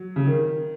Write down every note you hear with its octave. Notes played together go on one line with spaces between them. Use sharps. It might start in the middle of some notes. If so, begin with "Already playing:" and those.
Already playing: F#3
C#3
D#3